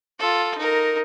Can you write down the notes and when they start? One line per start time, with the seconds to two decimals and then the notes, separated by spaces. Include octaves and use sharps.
0.19 F4 A4
0.57 D#4 A#4